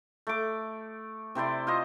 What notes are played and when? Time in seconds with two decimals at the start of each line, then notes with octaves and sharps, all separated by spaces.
0.27 A3 D6
1.35 C3 E4 C5 D5
1.67 F4 C5 D#5